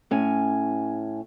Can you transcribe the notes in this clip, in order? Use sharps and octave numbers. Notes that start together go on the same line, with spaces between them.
A2 C#4 G#5